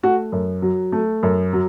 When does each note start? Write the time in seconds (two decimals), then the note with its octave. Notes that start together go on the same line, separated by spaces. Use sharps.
0.03 A3 F#4
0.32 F#2
0.62 F#3
0.92 A3
1.23 F#2
1.53 F#3